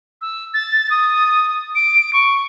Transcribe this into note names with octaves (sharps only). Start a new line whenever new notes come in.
E6
A6
D#6
D7
C#6